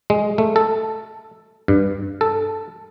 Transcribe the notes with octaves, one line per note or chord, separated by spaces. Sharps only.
G#3
A3
A4
G2
A4